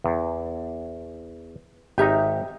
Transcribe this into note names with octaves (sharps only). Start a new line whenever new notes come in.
E2
G#1 D#4 G4 E5 A#5